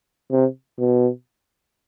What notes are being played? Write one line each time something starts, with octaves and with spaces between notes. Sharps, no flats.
C3
B2